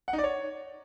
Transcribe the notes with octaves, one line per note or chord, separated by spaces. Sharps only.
F#5
D#4
D5
C#5